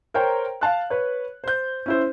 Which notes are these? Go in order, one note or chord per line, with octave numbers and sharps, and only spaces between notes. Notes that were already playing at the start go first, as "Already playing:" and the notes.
A#4 C5 C#5 G5 A#5
F5 A5 F#6
B4 C#5
C5 G6
C#4 E4 C5